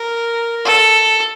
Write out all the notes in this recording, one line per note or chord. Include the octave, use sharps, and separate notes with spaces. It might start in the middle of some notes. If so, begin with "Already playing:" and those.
Already playing: A#4
A4